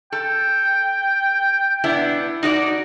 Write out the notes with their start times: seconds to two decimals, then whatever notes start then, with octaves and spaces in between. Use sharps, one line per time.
0.12 A4 G5
1.84 B3 D4 E4
2.43 D#4 F#4 D5